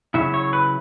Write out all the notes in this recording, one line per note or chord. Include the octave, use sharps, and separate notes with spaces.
C#3 F#3 E4 E5
C#5
B4